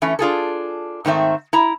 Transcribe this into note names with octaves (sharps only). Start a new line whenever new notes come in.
E3 A3 C#4
D4 F4 G#4 A4
G#2 D#3 A3 C4 E5
E4 A#5